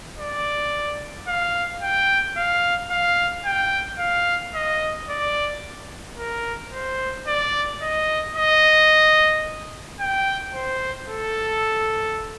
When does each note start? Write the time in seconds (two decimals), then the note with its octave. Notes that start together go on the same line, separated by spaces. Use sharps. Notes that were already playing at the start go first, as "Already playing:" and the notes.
0.18 D5
1.28 F5
1.81 G5
2.37 F5
2.91 F5
3.45 G5
3.99 F5
4.55 D#5
5.09 D5
6.18 A#4
6.73 C5
7.27 D5
7.82 D#5
8.36 D#5
10.00 G5
10.54 C5
11.09 A4